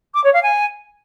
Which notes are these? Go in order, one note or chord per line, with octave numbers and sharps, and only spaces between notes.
D6
C#5
F5
G#5